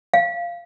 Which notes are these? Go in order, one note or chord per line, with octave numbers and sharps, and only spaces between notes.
F5